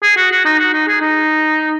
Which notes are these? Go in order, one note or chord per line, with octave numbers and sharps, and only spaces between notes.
G#4
F#4
F#4
D#4
F#4
D#4
G#4
D#4